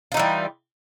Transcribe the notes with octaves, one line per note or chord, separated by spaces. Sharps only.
E3 G3 D#4 F4